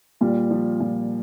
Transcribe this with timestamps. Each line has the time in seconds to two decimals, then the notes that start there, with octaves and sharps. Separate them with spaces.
0.21 A#2 G3
0.50 F3
0.80 A#2